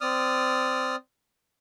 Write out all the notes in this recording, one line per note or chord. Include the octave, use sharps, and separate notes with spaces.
C4 D5 D#6 F6